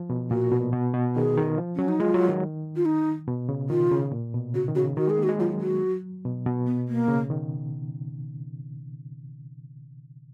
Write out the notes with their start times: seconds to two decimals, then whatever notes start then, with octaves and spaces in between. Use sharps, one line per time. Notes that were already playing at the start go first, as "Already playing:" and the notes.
Already playing: F3
0.10 B2
0.30 A#2 F#4
0.52 B2
0.73 B2
0.94 B2
1.15 D#3 G#4
1.37 D#3
1.58 F3
1.76 F#3 C#4
1.88 D#4
2.00 G#3 F4
2.14 F#3
2.29 D#3
2.76 F4
2.85 D#4
3.28 B2
3.49 C#3
3.70 D#3 F4
3.91 C#3
4.12 A#2
4.34 B2
4.54 C#3 F#4
4.68 D#3
4.75 C#3 F#4
4.97 D#3 F#4
5.08 G#3 G#4
5.18 A#3
5.23 F#4
5.29 G#3
5.39 F#3 F4
5.60 F#4
6.25 B2
6.46 B2
6.66 B3
6.88 A#3
7.08 C#3
7.30 D#3